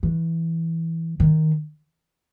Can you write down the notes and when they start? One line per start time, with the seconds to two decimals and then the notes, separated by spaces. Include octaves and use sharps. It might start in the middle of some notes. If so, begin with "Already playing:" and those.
0.03 E3
1.20 D#3